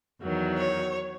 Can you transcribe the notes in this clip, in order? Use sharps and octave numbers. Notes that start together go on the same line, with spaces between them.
E2 D#3 F#3
C#5